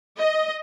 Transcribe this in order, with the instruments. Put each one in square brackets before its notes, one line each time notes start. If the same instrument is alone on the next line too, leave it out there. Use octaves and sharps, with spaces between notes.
[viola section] D#5